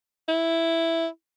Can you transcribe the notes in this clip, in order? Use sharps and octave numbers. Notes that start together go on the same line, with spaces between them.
E4